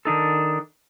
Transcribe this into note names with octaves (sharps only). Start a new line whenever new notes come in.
D#3 D4 D#4 A4